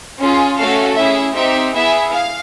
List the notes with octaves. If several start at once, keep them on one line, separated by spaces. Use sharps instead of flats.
C#4 F4 G#4
A3 C#4 F#4 A4 F5
C#4 E4 G#4 E5
C4 D#4 G4 E5
B3 E4 G#4 E5
F5